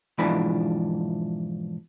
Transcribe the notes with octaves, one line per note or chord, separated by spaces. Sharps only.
G#2 B2 E3 F3 D4 B5